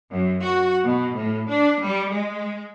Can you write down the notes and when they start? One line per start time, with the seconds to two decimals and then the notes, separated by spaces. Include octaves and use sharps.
0.11 F#2
0.43 F#4
0.84 B2
1.17 A2
1.48 D4
1.82 G3
2.11 G#3